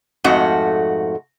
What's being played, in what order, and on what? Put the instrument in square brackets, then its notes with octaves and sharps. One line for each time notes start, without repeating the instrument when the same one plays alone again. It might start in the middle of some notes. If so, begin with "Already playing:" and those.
[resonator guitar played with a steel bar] F2 G#2 A3 F#4